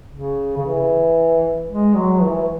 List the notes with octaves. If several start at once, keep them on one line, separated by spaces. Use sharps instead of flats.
C#3
C#3
E3
G#3
F#3
E3